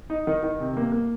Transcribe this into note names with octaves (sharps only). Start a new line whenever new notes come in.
D#4
D#3
D#3
C3
A#3
A#3